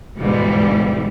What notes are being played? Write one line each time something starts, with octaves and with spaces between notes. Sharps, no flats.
G1 D2 G#2 B2 E3 G3